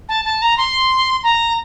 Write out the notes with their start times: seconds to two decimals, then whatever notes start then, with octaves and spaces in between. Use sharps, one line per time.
0.09 A5
0.25 A5
0.42 A#5
0.58 C6
1.23 A#5